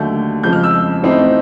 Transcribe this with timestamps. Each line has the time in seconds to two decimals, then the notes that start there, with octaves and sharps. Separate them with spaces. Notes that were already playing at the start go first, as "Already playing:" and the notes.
Already playing: D#2 D3 F#3 A3 G6
0.43 F2 C#3 F3 G#3 G6
0.53 F6
0.63 E6
1.02 A2 E3 A3 C4 D#4